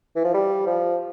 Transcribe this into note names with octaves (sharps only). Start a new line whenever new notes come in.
E3
F3
G3
F3